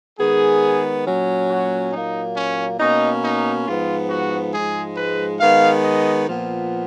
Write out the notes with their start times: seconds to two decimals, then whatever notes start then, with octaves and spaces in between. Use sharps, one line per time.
0.19 D#3 G#3 B3 G#4
1.06 A#2 F#3 C#4
1.49 F#4
1.92 A#2 F#3 A#3 D#4
2.35 C#4
2.79 B2 A#3 C#4 D#4
3.23 D#4
3.66 G#2 F3 B3 F4
4.09 F#4
4.53 G#2 F3 G#3 G#4
4.97 B4
5.39 D#3 G#3 B3 F5
5.83 D#5
6.27 A#2 F3 B3